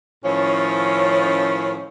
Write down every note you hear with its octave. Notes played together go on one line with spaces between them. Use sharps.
A2 D#3 F3 C#4